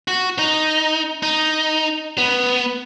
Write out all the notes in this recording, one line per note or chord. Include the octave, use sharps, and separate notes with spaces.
F#4
D#4
D#4
B3